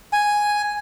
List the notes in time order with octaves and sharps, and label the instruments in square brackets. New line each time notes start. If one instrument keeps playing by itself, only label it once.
[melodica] G#5